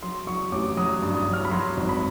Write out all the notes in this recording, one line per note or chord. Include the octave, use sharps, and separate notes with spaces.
F#3 C6
F#3 C#6
A1 D6
F#3 D#6
G2
D#6
F#3
F6
B5
F#3 C6
G#1
B5